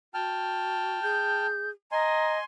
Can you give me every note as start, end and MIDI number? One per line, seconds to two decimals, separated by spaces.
0.14 1.00 66
0.14 1.47 79
0.14 1.47 81
0.14 1.47 89
1.02 1.71 68
1.02 1.70 91
1.92 2.39 75
1.92 2.44 80
1.92 2.33 82
1.92 2.44 84